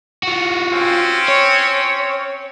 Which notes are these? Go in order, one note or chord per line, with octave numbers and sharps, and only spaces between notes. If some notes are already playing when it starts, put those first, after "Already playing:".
F4 F#4
C4 C#4
C#5